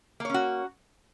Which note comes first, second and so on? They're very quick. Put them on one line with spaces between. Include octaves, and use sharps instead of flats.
A#3 C#5 C#4 F#4